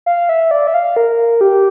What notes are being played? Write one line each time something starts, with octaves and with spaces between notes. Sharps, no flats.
F5
E5
D5
E5
F5
A#4
G4